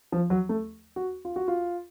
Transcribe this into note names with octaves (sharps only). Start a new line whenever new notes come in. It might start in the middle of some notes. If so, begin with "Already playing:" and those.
F3
F#3
A3
F#4
F4
F#4
F4